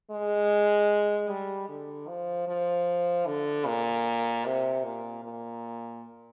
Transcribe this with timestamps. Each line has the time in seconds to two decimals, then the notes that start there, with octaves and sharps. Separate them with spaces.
0.11 G#3
1.29 G3
1.69 D3
2.08 F3
2.47 F3
3.26 D3
3.66 A#2
4.45 C3
4.84 A#2
5.23 A#2